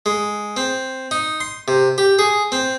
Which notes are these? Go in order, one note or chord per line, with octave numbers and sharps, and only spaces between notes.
G#3
C4
D#4
C6
C3
G4
G#4
C4